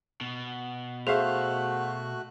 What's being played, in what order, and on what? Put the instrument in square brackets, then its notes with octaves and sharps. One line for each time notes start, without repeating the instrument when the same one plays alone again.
[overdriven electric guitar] B2
[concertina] A3 F#4 F#6 [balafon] G#4 [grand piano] C5 E5 F5